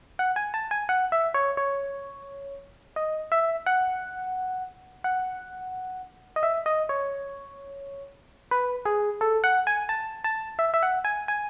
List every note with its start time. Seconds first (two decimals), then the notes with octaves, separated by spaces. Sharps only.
0.19 F#5
0.36 G#5
0.54 A5
0.71 G#5
0.89 F#5
1.12 E5
1.34 C#5
1.57 C#5
2.96 D#5
3.32 E5
3.66 F#5
5.04 F#5
6.36 D#5
6.43 E5
6.66 D#5
6.89 C#5
8.51 B4
8.86 G#4
9.21 A4
9.44 F#5
9.67 G#5
9.89 A5
10.24 A5
10.59 E5
10.74 E5
10.83 F#5
11.05 G#5
11.28 G#5